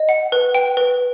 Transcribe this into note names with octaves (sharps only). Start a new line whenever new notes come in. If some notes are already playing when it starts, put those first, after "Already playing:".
Already playing: D#5
F#5
B4
G5
B4